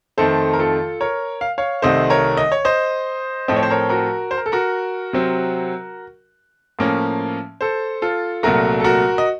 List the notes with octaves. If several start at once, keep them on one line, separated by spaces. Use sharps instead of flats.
F2 D#3 A3 A4 C5
A#4
F4 A4
A#4 C#5
F5
C#5 F5
C2 C3 D#3 A3 C5 D#5
A#4 C#5
D#5
C#5
C5 D#5
A2 F3 C4 D#5
C#5
C5
A#4 C#5
F#4 A#4
C5
A#4
A4
F#4 A#4
C3 F#3 C4
A2 F3 A#3 C#4
A4 C5
F4 A4
C2 A#2 F#3 A3 F#4 A#4
A4
F#4 A#4
D#5